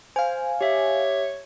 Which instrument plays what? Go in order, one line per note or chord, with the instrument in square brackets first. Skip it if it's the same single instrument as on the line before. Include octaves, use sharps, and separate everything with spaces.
[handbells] C5 [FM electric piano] F5 G#5
[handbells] G4 E5 [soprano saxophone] C#5